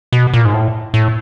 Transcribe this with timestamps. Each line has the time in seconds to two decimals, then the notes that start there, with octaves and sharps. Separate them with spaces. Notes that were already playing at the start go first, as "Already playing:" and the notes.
0.12 B2
0.34 A#2
0.45 G#2
0.54 A2
0.94 A2